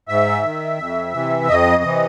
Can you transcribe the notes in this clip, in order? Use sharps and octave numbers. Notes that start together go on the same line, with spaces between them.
G#2 E5
D#3
F2
C3 E3
F2 D#5
C3 E3